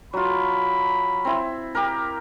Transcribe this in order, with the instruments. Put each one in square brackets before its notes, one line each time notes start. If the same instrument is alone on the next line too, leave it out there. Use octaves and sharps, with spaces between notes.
[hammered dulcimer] F#3 F4 [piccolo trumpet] B5
[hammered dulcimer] C4 E4
G4 A#4